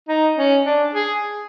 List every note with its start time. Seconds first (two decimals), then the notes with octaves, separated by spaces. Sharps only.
0.09 D#4
0.38 C#4
0.66 D4
0.93 G#4